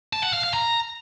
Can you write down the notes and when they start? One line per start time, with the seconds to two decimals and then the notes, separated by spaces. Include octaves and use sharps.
0.13 A5
0.23 F#5
0.33 F5
0.44 F5
0.54 A#5